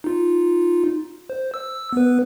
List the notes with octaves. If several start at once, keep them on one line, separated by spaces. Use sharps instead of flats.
D#4 F4
C5
E6
B3 B4